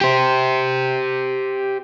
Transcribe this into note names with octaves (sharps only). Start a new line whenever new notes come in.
G4 C5